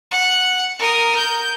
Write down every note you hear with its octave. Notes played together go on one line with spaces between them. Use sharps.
F#5
A#4 D#6
G6